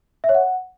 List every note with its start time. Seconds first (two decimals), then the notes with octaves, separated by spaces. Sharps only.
0.24 E5
0.29 C#5
0.34 F#5